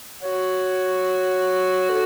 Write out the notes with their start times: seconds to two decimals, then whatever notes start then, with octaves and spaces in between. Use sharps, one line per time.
0.22 F#4 C#5
1.90 A4